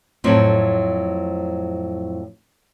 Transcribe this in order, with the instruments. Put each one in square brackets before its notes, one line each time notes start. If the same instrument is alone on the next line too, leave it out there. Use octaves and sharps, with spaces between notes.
[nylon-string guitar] F2 A2 F#3 C4